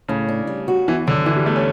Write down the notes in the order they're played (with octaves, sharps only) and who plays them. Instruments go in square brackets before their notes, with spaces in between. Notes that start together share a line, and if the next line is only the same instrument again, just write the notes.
[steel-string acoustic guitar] A2 [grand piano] C#3
[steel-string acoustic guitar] D4
G3
F#4
[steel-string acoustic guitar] E2 [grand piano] E3
[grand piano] D3 [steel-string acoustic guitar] F#3
[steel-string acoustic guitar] D3 [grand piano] E3
[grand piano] G3
[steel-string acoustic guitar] E2 [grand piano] A3
[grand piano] C#4